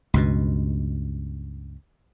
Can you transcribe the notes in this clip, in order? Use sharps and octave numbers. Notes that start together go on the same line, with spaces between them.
C#2 G2 B2